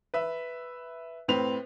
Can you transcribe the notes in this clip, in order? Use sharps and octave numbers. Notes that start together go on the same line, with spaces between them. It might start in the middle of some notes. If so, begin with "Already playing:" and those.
B4 E5
A2 C4 B4 F7